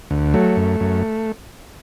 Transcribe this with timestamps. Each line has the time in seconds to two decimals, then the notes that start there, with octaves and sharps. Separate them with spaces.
0.11 D2
0.34 F#3 A3
0.56 F#2
0.80 F#2